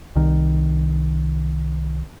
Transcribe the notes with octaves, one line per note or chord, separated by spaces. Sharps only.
C2 D#3